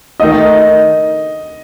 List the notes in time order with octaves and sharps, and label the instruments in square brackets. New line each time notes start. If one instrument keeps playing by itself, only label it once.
[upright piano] D#3 A3 D#4 [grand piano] D#5